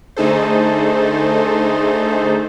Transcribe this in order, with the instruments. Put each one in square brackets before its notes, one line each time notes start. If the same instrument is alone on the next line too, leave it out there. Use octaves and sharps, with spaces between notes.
[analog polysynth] D3 A3 D#4 G#4 A4 C5